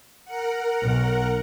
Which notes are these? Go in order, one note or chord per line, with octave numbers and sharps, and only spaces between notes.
A#4 F#5
B1